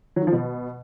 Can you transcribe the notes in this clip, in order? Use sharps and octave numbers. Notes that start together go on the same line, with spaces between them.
F#3
D#3
F3
B2